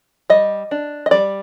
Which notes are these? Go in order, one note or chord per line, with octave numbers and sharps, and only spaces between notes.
G3 D#5
D4
D#5
G3 D5